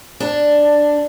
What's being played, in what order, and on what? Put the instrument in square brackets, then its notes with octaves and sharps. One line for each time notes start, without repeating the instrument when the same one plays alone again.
[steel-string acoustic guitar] D4